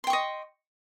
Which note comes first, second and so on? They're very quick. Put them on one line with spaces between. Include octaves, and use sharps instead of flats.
C6 G5 C#6 D#5